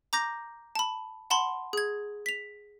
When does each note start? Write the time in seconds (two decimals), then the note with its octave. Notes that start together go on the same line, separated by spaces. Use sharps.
0.13 A#5 D6 G6 A#6
0.75 A5 B5
1.30 F#5 A5 B5 C6
1.73 G#4 G#6
2.26 B6 F7